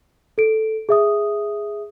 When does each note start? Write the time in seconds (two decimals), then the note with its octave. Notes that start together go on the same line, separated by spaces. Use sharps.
0.38 A4 D7
0.89 G#4 E5 D#6